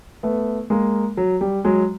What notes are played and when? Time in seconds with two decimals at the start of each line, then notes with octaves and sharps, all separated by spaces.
0.23 A3 B3
0.70 G#3 A#3
1.17 F#3
1.41 G3
1.65 F#3 G#3